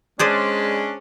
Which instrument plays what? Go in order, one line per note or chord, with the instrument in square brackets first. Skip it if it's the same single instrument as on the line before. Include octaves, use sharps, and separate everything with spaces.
[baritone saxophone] G#3 [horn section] C#4 D4 [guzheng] G#4 C5 D5